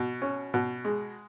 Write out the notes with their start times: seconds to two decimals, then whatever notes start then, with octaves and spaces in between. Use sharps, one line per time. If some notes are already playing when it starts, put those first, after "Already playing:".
Already playing: B2
0.22 C#4
0.54 B2
0.85 G#3